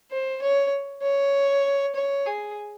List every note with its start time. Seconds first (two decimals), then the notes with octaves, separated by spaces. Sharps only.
0.11 C5
0.42 C#5
1.03 C#5
1.96 C#5
2.26 G#4